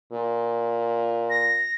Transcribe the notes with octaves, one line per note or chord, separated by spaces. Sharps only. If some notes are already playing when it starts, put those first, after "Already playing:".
A#2
A#6